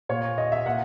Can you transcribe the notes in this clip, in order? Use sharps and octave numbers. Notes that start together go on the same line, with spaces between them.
A#2 C#5
D#5
E5
A#2 F#5